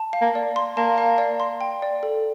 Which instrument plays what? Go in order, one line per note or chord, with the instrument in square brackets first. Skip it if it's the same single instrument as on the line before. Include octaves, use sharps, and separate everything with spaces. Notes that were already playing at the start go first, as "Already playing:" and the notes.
Already playing: [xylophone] A5
F5
[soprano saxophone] A#3
[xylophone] D5
C6
[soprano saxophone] A#3 [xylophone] A5
[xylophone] F5
D5
C6
G5
D5
A4